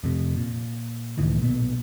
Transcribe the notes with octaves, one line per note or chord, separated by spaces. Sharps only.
F2 C3
A#2
C#2 A2 D#3 E3
B1 A#2 B3